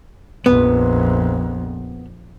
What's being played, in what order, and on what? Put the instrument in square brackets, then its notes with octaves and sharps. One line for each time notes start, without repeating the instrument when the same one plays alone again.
[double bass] A#1 F2 [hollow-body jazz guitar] B3